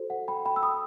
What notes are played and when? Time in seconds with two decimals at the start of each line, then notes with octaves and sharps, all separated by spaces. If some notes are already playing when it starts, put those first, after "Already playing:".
Already playing: F#4 A4 C5
0.10 F#5
0.28 G5 B5
0.45 G5 B5
0.56 E6
0.63 B5 D#6